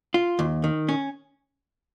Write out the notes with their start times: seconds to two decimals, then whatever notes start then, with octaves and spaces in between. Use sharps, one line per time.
0.14 F4
0.39 D#2
0.64 D#3
0.89 C#4